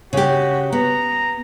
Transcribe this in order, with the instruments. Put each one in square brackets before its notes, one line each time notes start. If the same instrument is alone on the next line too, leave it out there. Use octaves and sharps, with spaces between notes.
[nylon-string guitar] C#3 G4 [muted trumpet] F#4
[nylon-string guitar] B3 [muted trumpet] A#5